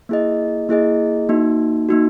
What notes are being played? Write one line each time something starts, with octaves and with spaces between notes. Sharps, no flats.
A#3 E4 G#4 D#5
A#3 E4 G#4 D#5
A#3 D#4 F#4
A#3 D#4 F#4